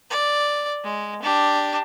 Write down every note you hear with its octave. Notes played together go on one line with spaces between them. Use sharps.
D5
G#3
D4 G4